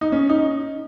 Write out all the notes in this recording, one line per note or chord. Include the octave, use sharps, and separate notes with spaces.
D#4
C#4
D#4